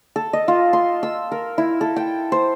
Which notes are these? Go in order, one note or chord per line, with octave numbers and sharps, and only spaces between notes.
A4
D#5
F4
C6
E6
A#4
E4
A4
G5
C5